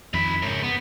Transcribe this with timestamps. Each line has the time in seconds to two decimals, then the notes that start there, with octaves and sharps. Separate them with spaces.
0.13 F2 D#3 D#4 B5
0.42 G#2 C#3 A#4 C#5
0.63 B3